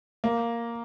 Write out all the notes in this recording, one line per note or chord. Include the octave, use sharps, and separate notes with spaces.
A#3